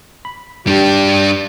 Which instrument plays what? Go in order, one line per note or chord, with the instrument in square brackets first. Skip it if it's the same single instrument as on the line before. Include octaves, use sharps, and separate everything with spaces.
[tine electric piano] B5
[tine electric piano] G2 [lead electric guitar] G3 D4 [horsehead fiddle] G4